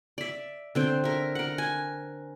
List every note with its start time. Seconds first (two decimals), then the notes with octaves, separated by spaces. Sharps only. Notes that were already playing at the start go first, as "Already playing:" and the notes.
0.18 D5 E5
0.75 D3 C4 G5
1.04 A#4 E5
1.35 A#4 F#5
1.58 G#5